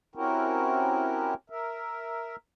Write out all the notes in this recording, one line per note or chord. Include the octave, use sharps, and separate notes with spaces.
C4 C#4 E4 F#4 G4 A#4
A#4 E5